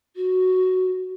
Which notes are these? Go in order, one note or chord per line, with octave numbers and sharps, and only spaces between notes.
F#4